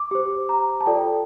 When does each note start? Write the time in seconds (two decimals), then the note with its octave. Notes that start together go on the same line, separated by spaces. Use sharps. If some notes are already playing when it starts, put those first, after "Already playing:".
Already playing: D6
0.11 G4 C5
0.49 A#5
0.81 A5
0.86 F4 A4 D5 G5